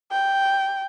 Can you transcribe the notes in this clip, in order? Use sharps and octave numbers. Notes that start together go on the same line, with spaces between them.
G5